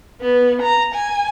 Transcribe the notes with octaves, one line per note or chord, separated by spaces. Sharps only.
B3
A#5
G#5